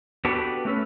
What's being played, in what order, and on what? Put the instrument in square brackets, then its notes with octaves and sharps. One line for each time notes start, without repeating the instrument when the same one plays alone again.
[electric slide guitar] B3 D4 F#4 G4 A4 B4
A3 C#4 A4 B4